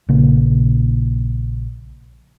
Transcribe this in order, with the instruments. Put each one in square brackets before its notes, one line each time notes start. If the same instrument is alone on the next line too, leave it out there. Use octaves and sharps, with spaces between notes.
[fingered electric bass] A#1 C#3 A#3